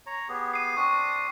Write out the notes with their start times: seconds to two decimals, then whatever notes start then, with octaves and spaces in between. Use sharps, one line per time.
0.06 C#5 A#5
0.29 B3 G4 G#4
0.53 C7 D#7
0.77 C4 D4 C#6 D#6